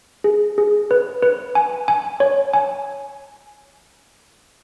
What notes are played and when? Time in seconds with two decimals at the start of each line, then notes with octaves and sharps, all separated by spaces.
0.24 G#4
0.58 G#4
0.91 B4
1.22 B4
1.55 G#5
1.88 G#5
2.20 C#5
2.53 G#5